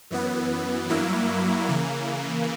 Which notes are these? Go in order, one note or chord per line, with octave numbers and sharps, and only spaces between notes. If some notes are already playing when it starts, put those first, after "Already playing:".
F#2 E3 B3
G2 F#3 A#3 E4
C#3 E3 A#3